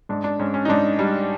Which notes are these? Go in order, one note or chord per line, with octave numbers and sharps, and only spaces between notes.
G#2 D4
D4
G#2 C#4
C#4
D#4
G#2 D4
G3